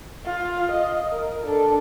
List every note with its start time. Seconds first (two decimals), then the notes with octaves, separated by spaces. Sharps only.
0.25 F4
0.71 D#5
1.11 A#4
1.44 D4 A4